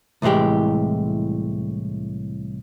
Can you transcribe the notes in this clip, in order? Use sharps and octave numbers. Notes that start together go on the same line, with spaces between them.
C2 A2 E3 G#3 G4